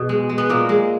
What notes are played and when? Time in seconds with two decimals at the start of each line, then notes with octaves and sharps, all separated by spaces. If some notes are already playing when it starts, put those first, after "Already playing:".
Already playing: B2 G#4
0.09 G#3
0.29 G#3
0.38 B3
0.49 A#2 A#3
0.69 G#3